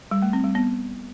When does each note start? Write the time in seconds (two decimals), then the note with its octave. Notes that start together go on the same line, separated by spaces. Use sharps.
0.11 G3
0.22 A3
0.33 C4
0.44 G3
0.55 B3